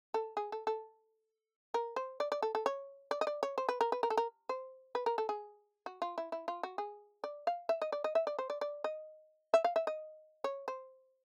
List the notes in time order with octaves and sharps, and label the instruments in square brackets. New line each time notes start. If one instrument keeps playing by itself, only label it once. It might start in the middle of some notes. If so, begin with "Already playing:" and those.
[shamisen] A4
G#4
A4
A4
A#4
C5
D5
D5
A4
A4
C#5
D5
D#5
D5
C#5
C5
B4
A#4
B4
A#4
A4
A#4
C5
B4
A#4
A4
G#4
F#4
F4
E4
E4
F4
F#4
G#4
D5
F5
E5
D#5
D5
D#5
E5
D5
C5
D5
D5
D#5
E5
F5
E5
D#5
C#5
C5